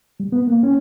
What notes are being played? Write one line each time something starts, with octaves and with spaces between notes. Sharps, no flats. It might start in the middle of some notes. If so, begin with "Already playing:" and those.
G3
B3
A#3
C#4